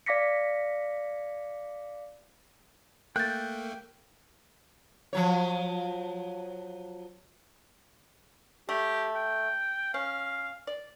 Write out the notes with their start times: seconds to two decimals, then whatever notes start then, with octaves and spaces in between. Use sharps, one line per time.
0.06 D5 F5 D6 A#6 B6 C#7
3.16 A3 A#3 G5 F#6 G6 A6
5.13 F3 F#3 C#5
8.69 A3 G4
9.15 G5
9.94 C#4 F5
10.67 D5